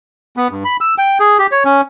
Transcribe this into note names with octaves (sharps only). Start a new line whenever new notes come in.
B3
G2
B5
E6
G5
G#4
G4
C#5
C#4